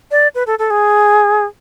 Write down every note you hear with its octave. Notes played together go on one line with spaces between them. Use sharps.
D5
B4
A4
A4
G#4